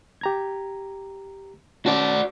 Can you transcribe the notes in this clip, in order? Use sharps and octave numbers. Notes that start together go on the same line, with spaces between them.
G4 A#5 G#6
C#4 F#4 D5 A5